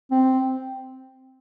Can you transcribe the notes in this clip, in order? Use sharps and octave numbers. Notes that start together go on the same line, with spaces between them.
C4